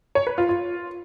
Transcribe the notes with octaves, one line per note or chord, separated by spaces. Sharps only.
C#5
B4
F4
F4